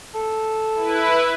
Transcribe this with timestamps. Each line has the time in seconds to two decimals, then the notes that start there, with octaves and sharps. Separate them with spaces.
0.15 A4
0.75 E4 B4